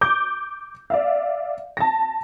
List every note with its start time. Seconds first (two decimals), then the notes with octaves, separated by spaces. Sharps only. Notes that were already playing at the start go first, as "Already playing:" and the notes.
0.01 D6 G6
0.90 D5 E5 F5
1.77 A5 A#6